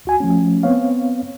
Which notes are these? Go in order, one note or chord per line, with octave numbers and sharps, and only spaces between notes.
D2 F#4 G#5
F3 A3 C#4
B3 C4 C#5 F5